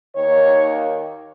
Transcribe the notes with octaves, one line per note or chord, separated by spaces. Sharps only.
D#2 D#3 A#3 C#5